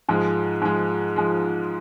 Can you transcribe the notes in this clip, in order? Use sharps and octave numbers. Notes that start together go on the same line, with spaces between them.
G#2 F3 G#3
G#2 F3 G#3
F3 G#3